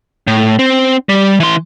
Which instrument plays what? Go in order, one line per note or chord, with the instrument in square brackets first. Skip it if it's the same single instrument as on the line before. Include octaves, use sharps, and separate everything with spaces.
[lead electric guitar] A2
C4
G3
E3 C6